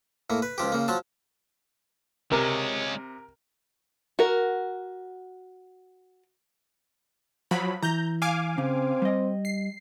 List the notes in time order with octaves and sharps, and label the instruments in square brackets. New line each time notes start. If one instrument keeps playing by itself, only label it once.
[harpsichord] A2 A#3
B4
C#2 F3 G4
C#3 A#3
F3 F#3 A5
[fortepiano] C3 [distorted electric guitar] G#3 C#4 [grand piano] A#4
[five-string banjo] F#4 A#4
[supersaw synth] F3 F#3 B5
[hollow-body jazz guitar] E3 [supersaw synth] A#5 G6
[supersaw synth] F5 G#5 D6
[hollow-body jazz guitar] C#3 [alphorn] C4
[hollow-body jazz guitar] G3 D#5
[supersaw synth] C7